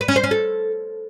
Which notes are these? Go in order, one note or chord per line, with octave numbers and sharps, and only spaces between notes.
B4
C#4
C5
C#4
A4